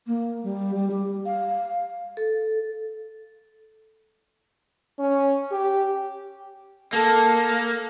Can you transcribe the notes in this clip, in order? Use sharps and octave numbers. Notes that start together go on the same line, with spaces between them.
A#3
G3
G3
G4
F5
A4
C#4
G4
A#3 A4